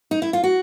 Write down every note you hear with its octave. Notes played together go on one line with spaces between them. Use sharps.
D#4
E4
F4
F#4